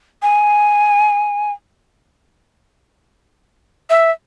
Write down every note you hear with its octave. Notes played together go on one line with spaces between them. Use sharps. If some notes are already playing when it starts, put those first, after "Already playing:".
G#5
E5